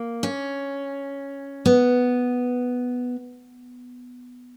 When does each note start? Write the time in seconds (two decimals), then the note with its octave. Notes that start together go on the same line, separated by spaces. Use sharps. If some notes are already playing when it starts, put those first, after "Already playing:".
Already playing: A#3
0.23 C#4
1.66 B3